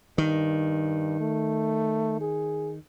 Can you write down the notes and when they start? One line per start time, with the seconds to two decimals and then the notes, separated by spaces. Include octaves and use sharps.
0.18 G2 D#3
1.21 A3
2.21 G#4